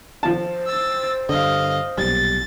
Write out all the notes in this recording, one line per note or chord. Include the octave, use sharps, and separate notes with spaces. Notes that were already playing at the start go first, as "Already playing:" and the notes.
F3 C5 A5
E6 A6
G2 D3 D#5 F5
B1 A#2 G3 A6